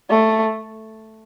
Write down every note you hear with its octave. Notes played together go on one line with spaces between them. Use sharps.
A3